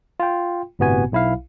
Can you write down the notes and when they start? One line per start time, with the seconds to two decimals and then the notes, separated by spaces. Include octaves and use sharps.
0.20 F4 G5
0.79 G1 A2 C3 B3 F#4 G#5
1.12 B1 E4 F5